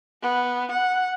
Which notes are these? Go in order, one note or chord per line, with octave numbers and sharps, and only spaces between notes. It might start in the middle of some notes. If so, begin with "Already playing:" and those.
B3
F#5